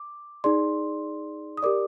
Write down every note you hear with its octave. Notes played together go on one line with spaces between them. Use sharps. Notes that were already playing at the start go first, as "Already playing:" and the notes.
Already playing: D6
D#4 G#4 D5 C6
D#6
G4 A#4 D5 D6